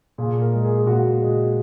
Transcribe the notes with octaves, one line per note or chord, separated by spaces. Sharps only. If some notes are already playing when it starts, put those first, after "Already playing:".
A#2 G#4
A#4
G#3
G#4
A#2 F#4
G#3